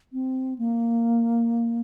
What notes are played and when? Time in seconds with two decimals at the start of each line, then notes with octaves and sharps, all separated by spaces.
0.13 C4
0.58 A#3